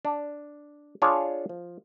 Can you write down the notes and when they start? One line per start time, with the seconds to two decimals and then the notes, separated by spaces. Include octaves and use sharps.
0.05 D4
1.02 D4 F4 G#4 C#5
1.49 F3